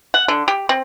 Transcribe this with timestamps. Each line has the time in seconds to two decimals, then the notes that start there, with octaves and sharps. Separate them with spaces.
0.14 F#5
0.28 D3
0.48 G4
0.69 C4